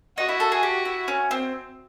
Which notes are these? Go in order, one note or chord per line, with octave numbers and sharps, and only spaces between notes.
D#4 F#4
E4
A4
G#4
G4
E4
C#4
C4